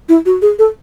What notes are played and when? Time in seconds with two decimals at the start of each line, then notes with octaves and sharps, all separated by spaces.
0.09 E4
0.26 F#4
0.42 G#4
0.59 A4